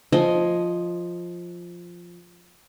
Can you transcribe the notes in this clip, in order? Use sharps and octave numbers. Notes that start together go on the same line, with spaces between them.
F3 D#5 G#5